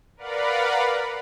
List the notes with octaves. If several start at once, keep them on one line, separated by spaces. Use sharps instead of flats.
A#4 B4 D5 F5 F#5 B5